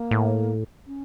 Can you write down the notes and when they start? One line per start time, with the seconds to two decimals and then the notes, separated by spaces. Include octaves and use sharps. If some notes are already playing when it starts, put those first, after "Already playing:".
Already playing: A#3
0.11 A2
0.87 C#4